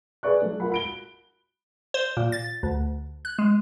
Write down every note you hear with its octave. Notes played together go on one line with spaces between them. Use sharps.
G#4 B4 D5 C#6 F#6
F#3 A3
F4 F#4 A#4 F#5 B5
B5 D7 G7
C5
A#2
A6
D2
F#6
G#3